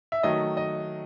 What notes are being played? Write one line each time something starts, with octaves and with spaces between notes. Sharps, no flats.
E5
D#3 F#3 A3 D#5
D#5